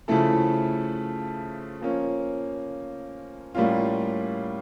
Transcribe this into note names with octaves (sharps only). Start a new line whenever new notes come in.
C#3 F3 A3 E4 A4
F3 A#3 C#4
A2 G3 A#3 C#4 F4